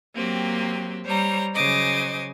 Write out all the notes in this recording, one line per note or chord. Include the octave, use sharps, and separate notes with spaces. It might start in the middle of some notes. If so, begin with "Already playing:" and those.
F#3 A#3 C4 G4
G3 C5 C#5 A#5
C#3 F#3 C5 D#5 G#5 D6